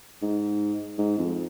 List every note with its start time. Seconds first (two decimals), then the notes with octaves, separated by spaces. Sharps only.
0.22 G#2
0.99 G#2
1.18 F2